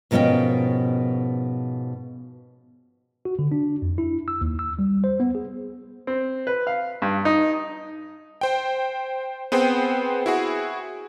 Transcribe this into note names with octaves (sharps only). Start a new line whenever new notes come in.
G#2 B2 F3 C#4 A#4 G5
F#4
D3
D4
F2
E4
E6
D#2
E6
G3
C5
B3
G#4
C4
B4
F5
G2
D#4
C5 G5
B3 C4 G#4 C5 G5
E4 F#4 G#4